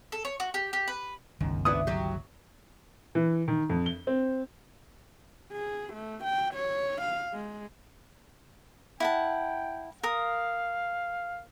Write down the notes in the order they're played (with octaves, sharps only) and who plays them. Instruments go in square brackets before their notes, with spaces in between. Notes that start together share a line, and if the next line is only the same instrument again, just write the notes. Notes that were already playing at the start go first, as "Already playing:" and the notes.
[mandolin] A4
C#5
F#4
G4
G4
B4
[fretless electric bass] G1 C#2 D#3 [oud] F#2
[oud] B3 D4 E4 [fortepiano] D#6
[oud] F#3 G4
[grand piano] E3
D#3
F2
G7
C4
[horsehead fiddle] G#4
A3
G5
C#5
F5
G#3
[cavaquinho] E4 F#5 A5 [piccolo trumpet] G5
[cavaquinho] A#4 D#6 [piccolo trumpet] F5